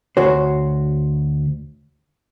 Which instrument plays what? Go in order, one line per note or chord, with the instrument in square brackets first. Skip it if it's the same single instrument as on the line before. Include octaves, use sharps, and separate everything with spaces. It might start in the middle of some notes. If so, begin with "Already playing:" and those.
[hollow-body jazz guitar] D2 F#4 C5 [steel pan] C#5